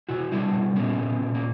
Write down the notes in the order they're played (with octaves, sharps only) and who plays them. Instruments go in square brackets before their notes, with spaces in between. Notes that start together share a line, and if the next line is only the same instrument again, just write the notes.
[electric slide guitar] B2 E4 F#4
G3 D4 E4
B2
A#2 B3 C#4
A#2
A#2
A#3